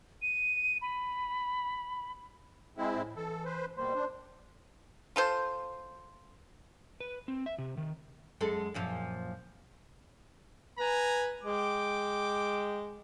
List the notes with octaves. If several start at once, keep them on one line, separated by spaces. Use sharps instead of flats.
D#7
B5
G#3 C4 E4 G#4
A2
E3 A4
B4 C5
B2 G3 A#3 C5
D4
F4 A4 C5
B4
C4
E5
C3
D#3
F#2 G#3 A4
F#2 A#2 F3
B4 G#5 A#5
G#3 G5 D6